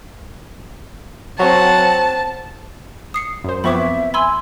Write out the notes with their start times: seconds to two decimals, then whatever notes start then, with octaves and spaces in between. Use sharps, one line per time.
1.39 F#3 C4 F#5 A5
3.14 D#6 C7 C#7
3.44 F#2 C5
3.64 F3 B3 C4 E5 B5 C#6 D6
4.14 G#5 B5 C6 E6